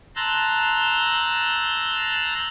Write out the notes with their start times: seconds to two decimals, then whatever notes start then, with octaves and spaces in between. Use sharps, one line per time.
0.16 A5 A#5 C6 E6 F#6 G6